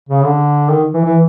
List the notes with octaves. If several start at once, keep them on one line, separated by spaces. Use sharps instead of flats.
C#3
D3
D#3
E3
E3